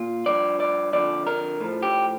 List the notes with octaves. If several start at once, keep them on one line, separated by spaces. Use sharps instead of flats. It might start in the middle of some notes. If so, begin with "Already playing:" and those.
Already playing: A#2 F4
G2 F3 D5
D5
F2 D3 F3 D5
A#4
A2 F3
G4